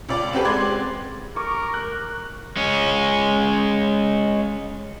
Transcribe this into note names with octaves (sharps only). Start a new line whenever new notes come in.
C#2 D5 D6
C4 C#4 F#4 G4 A4 B4
G#3 D5 C6 G#6
A#4 C#6 D6
F#6
G#3 C#4